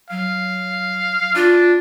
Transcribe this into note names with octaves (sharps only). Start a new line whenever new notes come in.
F#3 F5
D4 F4